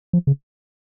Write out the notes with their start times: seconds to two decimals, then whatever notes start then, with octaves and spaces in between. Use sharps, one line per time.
0.13 F3
0.27 C#3